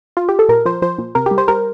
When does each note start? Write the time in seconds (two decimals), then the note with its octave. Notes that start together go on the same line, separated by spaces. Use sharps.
0.17 F4
0.29 G4
0.39 A4
0.49 A#2 A#4
0.65 F3 C5
0.82 F3 C5
0.98 A#2
1.15 C3 A#4
1.26 G4
1.31 G3
1.38 C5
1.48 G3 A#4